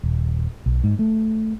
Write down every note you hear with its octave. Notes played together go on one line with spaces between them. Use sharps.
D#1
B1
G#2
A3